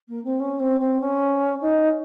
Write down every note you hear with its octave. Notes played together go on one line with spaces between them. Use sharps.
A#3
C4
C#4
C4
C4
C#4
D#4